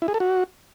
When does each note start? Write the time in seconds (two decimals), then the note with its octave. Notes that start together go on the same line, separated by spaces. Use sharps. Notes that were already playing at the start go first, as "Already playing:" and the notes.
0.02 E4
0.08 G#4
0.14 A4
0.20 F#4